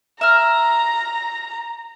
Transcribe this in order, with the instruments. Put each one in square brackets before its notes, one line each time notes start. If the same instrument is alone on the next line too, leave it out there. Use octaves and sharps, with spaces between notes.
[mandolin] E5 F6 [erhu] A#5